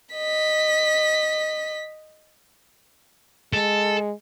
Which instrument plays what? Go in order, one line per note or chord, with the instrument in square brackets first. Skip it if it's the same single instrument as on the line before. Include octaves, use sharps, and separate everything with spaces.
[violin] D#5 B6
[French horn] G#3 [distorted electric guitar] A4